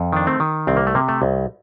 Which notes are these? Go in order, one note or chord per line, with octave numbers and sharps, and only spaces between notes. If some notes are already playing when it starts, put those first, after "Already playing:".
Already playing: F2
D#3 D4
A3 C4
D#3
C2 C4
A#3
A3
C3 A#3
A3
C2